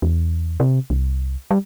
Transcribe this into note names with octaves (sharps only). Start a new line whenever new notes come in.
E2
C3
C2
G3